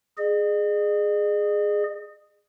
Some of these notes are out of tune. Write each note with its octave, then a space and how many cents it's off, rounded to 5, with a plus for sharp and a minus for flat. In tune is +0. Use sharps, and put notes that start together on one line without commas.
G#4 +0 D#5 -45